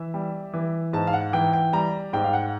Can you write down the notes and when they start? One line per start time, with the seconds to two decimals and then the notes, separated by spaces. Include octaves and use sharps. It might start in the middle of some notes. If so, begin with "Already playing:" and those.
Already playing: E3 E5
0.14 G3
0.53 E3
0.93 G#2 A5
1.07 F5
1.13 F#5
1.33 E3 G5
1.53 G5
1.73 G3 A#5
2.13 G#2 G5
2.24 F5
2.33 F#5